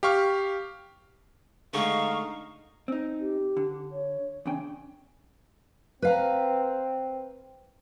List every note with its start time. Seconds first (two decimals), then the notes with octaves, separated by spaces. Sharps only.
0.03 G4 F5 C#6 F6
1.74 D3 G#3 A3 D#4 F5 C#6
2.88 C4 D#4
3.20 G4
3.57 D3
3.92 C#5
4.46 E2 C#3 D4 G5
6.02 C4 B4 F5 A#5